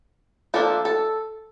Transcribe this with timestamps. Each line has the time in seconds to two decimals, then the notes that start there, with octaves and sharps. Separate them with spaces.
0.54 F3 A#3 D4 A4
0.85 A4